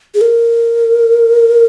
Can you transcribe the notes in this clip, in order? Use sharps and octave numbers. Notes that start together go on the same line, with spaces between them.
G#4
A#4